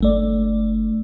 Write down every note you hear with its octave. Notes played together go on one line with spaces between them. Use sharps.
G1 A3 D5